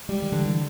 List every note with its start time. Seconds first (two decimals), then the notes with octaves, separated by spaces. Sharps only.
0.09 G3 G#3
0.22 D#3
0.32 D3 E3
0.46 E3